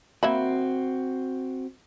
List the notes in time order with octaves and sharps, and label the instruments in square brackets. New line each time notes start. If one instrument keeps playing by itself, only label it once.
[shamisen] A#3 E5 B5 [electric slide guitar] C4 F#4